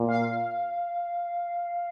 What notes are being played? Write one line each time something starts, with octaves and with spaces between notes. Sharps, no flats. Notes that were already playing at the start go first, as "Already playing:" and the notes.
Already playing: A#2
F5